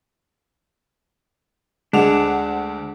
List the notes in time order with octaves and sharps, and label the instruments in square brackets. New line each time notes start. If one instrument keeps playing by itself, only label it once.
[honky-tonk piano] D2 F#5 F7 [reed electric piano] G#3 [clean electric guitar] D4